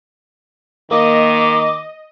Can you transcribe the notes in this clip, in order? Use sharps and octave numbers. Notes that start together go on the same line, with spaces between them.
D#3 A#3 D#5 D6